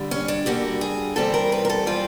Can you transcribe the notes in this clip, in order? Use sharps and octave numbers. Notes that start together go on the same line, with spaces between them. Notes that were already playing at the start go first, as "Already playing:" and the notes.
Already playing: D3 G3
C#4
D4
D3 G3 A#3 F#4
G#4
E3 G3 C4 A4
A#4
B4
A#4
A4
E3 G3 C4 F4